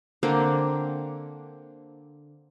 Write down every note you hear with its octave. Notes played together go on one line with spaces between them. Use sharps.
D3 A#3 C4 D4